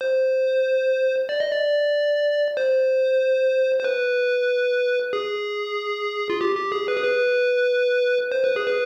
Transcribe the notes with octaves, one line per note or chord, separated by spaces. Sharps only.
C5
D5
D#5
D5
C5
C5
B4
G#4
F4
G4
G4
G#4
B4
G#4
B4
C5
B4
G#4
B4